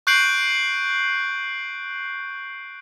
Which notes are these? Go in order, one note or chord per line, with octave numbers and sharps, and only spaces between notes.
C#6 F#6 G6 C7 D7 F#7